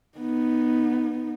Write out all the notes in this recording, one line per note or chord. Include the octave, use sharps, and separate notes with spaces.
B3 D#4